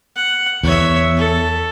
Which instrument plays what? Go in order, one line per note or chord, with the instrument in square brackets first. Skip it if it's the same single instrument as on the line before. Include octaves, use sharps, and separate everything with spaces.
[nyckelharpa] F#5
[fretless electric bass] E2 [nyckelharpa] C#5 E5
[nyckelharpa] A4